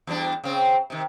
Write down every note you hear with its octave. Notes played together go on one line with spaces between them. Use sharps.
E2 G3 D4
C#3 C4
C3 D#3